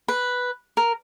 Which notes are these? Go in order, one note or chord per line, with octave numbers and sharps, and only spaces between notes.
B4
A#4